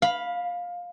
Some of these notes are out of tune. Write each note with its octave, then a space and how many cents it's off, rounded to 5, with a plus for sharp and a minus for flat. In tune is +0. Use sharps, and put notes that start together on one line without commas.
F5 +15 B5 -5